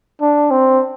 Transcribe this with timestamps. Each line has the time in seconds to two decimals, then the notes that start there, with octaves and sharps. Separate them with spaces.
0.21 D4
0.51 C4